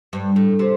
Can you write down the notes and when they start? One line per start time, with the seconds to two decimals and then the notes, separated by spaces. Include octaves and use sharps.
0.13 G2
0.36 A2
0.59 C3